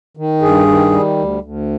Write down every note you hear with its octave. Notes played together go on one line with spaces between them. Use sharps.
D#3
G2 G#4
D#3
G3
D2
D2